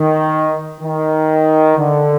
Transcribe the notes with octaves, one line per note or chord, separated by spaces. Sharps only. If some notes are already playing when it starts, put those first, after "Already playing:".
Already playing: D#3
D#3
D3